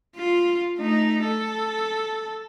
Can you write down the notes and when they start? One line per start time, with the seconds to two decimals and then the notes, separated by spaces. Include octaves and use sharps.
0.17 F4
0.78 A3 D#4
1.24 A4